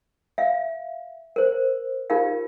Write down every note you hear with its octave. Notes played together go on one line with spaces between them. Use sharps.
E5 F5
A#4 C5
D#4 F4 G4 A#4 F5